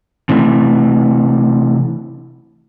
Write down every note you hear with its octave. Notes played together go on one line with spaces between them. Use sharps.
C3 E3 A3